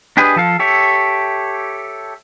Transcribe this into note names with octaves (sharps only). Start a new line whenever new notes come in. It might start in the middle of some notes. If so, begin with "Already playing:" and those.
D4 G4 G#4 B4 D#5
F3 A4 F5
G4 A4 C#5 E5